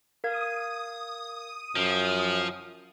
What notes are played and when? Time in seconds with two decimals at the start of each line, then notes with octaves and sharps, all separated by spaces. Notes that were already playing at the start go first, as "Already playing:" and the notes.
0.24 A#4 F5 D#6 G#6
1.76 F#2 F3 D7